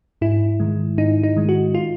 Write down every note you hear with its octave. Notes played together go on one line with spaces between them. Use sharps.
G#2 E4
D#3 G#3
G#2 D#4
D#4
D#3 G#3
F#4
F4